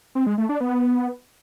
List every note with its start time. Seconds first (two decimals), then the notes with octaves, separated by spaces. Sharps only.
0.15 C4
0.27 G#3
0.38 A3
0.49 D4
0.60 B3